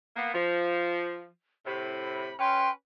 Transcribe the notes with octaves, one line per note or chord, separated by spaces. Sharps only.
A#3 B3
F3
A2 C3 B5
C#4 B4 G5 C6